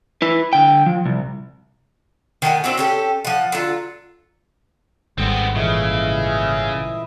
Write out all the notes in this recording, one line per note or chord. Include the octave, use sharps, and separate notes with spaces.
E4 B4
D3 G5
F3
C2
D#3 A3 F#5 G#5
C4 D4 E4 F#4
C#4 G4 A4
F3 F#5
D3 F#3 F4
G#1 G3 G#3 B3 C4 A4
A#2 C#3 E3 E4 A4 D#5 E5